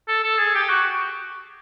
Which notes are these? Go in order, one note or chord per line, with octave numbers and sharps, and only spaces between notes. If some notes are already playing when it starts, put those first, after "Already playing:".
A4
A4
G#4
G4
F#4